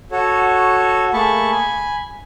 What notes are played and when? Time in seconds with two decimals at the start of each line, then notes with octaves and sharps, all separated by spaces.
0.11 F#4 A4 C#5
1.13 A3 A#3 G#4 A5 B5 C#6
1.51 G#5 B5